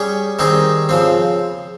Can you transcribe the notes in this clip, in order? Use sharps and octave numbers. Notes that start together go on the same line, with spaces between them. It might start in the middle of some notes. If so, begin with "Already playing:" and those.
Already playing: G3 C#4 G#4 C#5
D#3 G3 C4 D#4 G#4
C#3 F3 C4